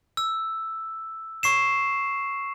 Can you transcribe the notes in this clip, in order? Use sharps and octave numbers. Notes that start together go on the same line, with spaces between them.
E6
C#6 C7 E7